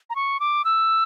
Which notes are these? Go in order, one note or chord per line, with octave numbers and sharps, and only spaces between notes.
A#5
C#6
D6
E6